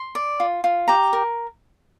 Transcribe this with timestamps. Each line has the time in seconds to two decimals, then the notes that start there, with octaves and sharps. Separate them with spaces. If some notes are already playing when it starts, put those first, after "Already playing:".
Already playing: C6
0.15 D5
0.40 F4
0.64 F4
0.88 G4 A#5
1.13 A#4